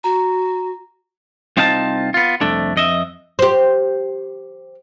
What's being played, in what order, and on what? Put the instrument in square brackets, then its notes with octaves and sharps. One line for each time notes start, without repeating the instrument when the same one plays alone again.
[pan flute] F#4 [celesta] A#5
[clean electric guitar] C2 C4 D#4 F4 F5 A5
B3 F4
C2 F2 A3 D4
F2 D#5 E5
[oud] G4 C5